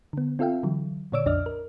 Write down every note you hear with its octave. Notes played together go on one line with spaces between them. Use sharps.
D3 B3
C4 F4 A4 E5 F5 G5
D3 E3 F#3
A#2 D3 C#5 D5 E6 D7
B1 F2 D4 D5 D#5 F6
A#4